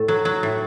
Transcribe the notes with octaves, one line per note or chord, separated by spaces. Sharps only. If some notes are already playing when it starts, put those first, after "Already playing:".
Already playing: A2 A3 A4
F#3
F#3
A2